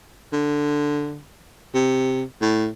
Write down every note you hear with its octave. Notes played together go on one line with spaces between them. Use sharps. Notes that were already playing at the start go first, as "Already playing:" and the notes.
D3
C3
A2